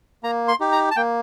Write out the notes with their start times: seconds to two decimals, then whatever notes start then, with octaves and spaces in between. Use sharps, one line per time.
0.23 A#3 A#5
0.48 C6
0.60 D#4 G4
0.72 A#5
0.91 A5
0.96 A#3 G5